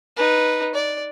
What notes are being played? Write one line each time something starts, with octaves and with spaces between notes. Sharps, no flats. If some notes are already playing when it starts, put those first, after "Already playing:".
D#4 B4
D5